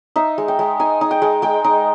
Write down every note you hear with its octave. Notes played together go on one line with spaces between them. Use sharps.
D#4 E5
G#3
G5
G#3
D#4 G#5
D#4
G5
G#3
G#3 G5
D#4